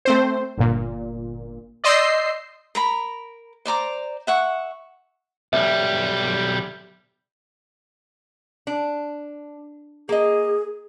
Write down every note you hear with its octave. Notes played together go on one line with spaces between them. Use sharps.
A3 C4 C5
G1 A#2
D5 D#5 C6 E6 G6 C7
A#4 A#5 B5
C5 D5 A#5 D6
E5 F#5 C#6
B1 G3 E5
D4
A#3 G#4 D#5